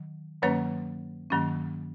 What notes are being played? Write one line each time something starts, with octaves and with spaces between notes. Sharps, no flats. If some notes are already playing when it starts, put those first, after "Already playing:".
Already playing: D#3 F#3
G2 D#3 F#3 A#3 C#4 B4 C#5
G2 D#3 F#3 A#3 C#4